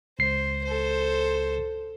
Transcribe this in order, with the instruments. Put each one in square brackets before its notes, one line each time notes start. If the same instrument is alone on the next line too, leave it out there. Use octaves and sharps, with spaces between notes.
[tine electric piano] C#2 C7 [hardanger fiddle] C5
[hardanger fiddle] A4 C5